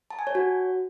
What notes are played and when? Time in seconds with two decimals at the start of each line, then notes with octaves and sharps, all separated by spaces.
0.10 A5
0.19 G#5
0.27 C#5
0.35 F#4